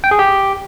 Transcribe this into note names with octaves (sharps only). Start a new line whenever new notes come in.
G5
G#4
G4